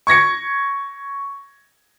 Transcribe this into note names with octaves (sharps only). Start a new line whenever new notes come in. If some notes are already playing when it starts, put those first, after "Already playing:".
C#6 G#6 A#6 C#7